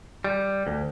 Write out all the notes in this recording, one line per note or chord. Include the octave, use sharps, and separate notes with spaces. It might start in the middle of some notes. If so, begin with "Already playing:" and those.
G3
D2